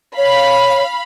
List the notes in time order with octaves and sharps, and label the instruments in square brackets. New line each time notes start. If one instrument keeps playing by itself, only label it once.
[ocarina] C#5 [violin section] F5 B5